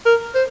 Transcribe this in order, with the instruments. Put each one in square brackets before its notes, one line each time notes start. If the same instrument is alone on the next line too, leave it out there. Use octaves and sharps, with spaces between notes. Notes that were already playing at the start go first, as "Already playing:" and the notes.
[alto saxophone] A#4
C5